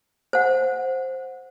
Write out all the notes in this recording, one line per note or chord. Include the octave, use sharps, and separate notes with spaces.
C5 F#5